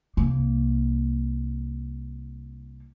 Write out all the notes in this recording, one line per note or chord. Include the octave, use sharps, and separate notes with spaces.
C2 A#3